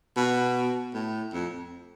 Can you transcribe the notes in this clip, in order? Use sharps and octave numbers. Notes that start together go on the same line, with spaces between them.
B2
A2
F2